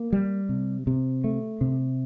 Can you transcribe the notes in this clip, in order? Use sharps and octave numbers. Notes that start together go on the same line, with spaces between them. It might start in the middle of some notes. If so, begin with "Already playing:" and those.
Already playing: A#3
G3
C3
C3
A3
C3